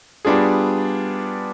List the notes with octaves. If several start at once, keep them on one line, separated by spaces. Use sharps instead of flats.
G3 B3 D4 F4 G#4